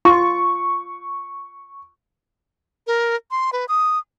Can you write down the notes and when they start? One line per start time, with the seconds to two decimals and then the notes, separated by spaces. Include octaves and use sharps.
0.05 F4 C#6
2.87 A#4
3.31 C6
3.53 B4
3.68 D#6